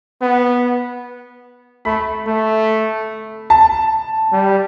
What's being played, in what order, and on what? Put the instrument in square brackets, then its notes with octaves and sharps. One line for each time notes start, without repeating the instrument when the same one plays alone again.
[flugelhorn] B3
[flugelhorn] A3 [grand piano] B5
[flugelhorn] A3
[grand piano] A5
[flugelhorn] G3